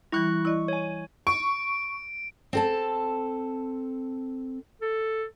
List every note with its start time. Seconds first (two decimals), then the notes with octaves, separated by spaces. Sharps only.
0.12 E3 G3 E4 C#6 F#6
0.45 E4 D5 D#5 C#6
0.68 C#5 G#5
1.27 C#6 D7
2.53 C4 A4 A5
4.82 A4